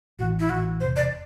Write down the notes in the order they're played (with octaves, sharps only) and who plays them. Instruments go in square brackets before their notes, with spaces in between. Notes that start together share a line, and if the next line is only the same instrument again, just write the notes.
[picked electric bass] A1 A2 E3 [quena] F#4
[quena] E4
[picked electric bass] A1 A2 E3 [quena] F#4
[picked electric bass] E1 E2 C3 [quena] C5
[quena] D5